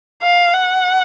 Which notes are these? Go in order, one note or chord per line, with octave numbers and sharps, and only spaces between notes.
F5
F#5